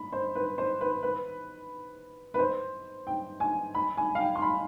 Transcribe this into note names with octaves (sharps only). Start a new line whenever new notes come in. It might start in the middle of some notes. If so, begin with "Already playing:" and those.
Already playing: B5
C5
B4
C5
B4
B4
B4
C5
G5
G#5
B5
G#5
F5
G5
C6
B5